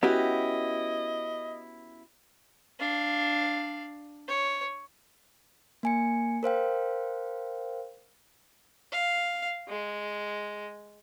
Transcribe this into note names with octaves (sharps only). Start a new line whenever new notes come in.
B3 C#4 E4 F#4 G4 D#5
D4 F5
C#5
A#3 G#5 C#7
A#4 C5 F5 G5
F5
G#3